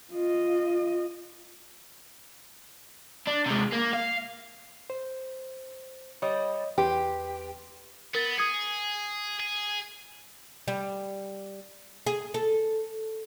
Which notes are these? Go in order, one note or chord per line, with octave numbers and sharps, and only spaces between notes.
F4 D#5
D4
C3 G#3
A#3
F5
C5
G3 C#5 D#5 D#6
E2 G4 B4 C6
B3 A#4 A6 B6
G#4 D#6 G#6 C#7
G#4
G3
G#4
A4